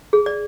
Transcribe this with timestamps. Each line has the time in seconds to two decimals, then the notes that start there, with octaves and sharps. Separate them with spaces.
0.13 G#4
0.26 D5